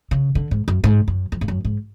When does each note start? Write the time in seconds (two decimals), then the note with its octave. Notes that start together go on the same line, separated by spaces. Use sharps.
0.11 C#3
0.35 D3
0.51 G#2
0.68 F#2
0.84 G#2
1.08 F#2
1.32 F2
1.41 G#2
1.48 F#2
1.65 G#2